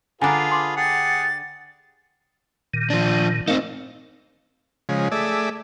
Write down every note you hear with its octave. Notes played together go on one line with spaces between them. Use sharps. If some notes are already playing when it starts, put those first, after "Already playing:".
D3 D4 F4 G#4 B4 G#5 A#5
C6 D6
G4 G#4 F#5 A6
A#2 D#3
F3 D4
A3 C4 D#4 A#4 F5
C#3 F3 G#3
A3 G#4 D5 E5